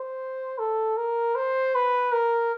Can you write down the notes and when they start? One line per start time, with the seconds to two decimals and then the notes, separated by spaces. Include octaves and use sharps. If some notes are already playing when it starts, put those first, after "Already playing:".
Already playing: C5
0.59 A4
0.97 A#4
1.35 C5
1.75 B4
2.12 A#4